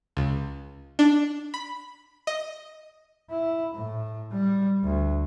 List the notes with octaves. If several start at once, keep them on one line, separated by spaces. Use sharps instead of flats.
C#2
D4
B5
D#5
E4
A2
G3
D2